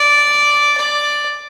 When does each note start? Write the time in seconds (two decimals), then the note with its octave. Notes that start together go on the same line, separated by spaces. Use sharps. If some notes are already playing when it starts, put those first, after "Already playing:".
Already playing: D5
0.77 D5